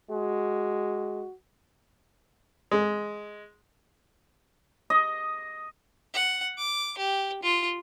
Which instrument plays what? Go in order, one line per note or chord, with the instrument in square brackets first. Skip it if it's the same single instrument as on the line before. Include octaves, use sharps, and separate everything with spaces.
[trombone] G#3 [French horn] F#4
[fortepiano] G#3
[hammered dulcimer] D#5
[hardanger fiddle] F#5
D6
G4
F4